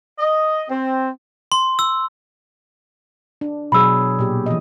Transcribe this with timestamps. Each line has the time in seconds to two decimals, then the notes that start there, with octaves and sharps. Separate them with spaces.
0.19 D#5
0.69 C4
1.52 C6
1.79 E6
3.41 D4
3.72 B2 F#3 G#4 B5 E6
4.19 A#2 G4
4.46 E3 D#5